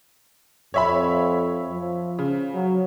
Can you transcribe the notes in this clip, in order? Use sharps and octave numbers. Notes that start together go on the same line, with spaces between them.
F2 C#5 E5 B5
F3
C#3
F#3